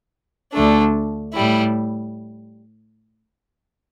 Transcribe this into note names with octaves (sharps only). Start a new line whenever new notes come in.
D2 D3 A3 D4
A2 G3 E4